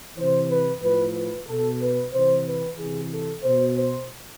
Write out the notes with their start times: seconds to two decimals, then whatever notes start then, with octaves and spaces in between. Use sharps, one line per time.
0.17 C3 E3 C5
0.49 B4
0.82 A2 F3 B4
1.15 B4
1.47 B2 A4
1.80 B4
2.12 C3 E3 C5
2.46 B4
2.78 C3 E3 G#4
3.11 A4
3.43 B2 C5
3.76 C5